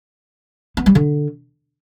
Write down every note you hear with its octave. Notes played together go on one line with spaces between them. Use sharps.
B3
G3
D3